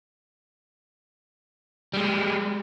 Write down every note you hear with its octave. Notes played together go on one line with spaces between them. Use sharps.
G3 G#3